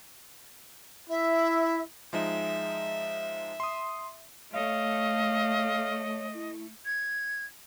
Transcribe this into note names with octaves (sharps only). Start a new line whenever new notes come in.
E4 E5
F3 G#3 D#4 E5
C6 D#6
A3 C#5 D#5 F5
E4
G#6